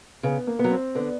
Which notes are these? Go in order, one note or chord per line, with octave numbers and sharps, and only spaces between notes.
C#3 B3
A#3
B3
F#3
C4
D3 B3